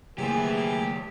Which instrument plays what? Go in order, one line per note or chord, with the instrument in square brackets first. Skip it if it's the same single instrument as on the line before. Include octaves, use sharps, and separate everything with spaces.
[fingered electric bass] C#3 A3 A#3 [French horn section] E3 G#4 [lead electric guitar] F#3 C5 [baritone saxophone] G4